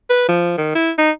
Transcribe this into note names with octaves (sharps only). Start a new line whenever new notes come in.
B4
F3
D#3
E4
D#4